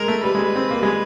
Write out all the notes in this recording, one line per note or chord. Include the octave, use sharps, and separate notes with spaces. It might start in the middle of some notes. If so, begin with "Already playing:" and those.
Already playing: G#3 A#4
A3
G3 B4
G#3
G3
C4
A#3
G3
G#3